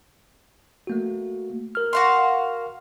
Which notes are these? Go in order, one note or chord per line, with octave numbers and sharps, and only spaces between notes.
A3 A#3 F#4
A#4 F6
F#4 F5 C6